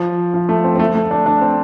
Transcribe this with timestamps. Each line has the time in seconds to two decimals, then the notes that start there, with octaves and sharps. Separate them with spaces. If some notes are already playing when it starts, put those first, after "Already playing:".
Already playing: F3
0.34 F3
0.49 A3
0.64 C4
0.76 C4
0.79 A3
0.95 A3
1.11 D4
1.26 D4
1.41 C4